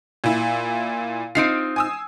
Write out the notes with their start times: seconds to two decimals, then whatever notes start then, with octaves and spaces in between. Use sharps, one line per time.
0.24 A#2 E4
1.35 C4 D#4 F4 C7 D7
1.76 G#5 D#6 E6